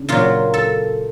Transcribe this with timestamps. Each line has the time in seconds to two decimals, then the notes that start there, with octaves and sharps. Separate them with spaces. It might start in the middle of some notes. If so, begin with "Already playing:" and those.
Already playing: C#3 D4
0.09 A#2 F#3 F4
0.54 A4